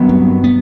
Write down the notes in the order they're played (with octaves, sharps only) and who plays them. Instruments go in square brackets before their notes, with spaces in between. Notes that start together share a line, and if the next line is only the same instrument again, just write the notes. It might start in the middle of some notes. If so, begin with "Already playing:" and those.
Already playing: [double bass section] G2 D#3 F#3 B3
[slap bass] C4
B3